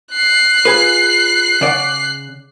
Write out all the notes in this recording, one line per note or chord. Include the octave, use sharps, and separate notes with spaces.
F#6 C7
F4 G#4 B4
C#3 D5 F#5